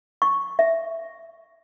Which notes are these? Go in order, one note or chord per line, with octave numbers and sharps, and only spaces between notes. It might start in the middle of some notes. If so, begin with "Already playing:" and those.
C#6
E5